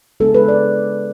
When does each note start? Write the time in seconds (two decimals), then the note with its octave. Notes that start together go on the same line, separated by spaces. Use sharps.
0.20 C#3 G#3 B3 D4 A4
0.35 B4
0.48 D5